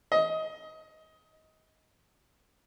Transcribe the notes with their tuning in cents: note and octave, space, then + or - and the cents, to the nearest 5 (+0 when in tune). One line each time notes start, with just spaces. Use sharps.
D#5 +20